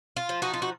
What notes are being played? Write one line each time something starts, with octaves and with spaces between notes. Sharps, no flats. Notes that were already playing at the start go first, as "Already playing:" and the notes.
F4
F3
D#4 F#4
F4
F#4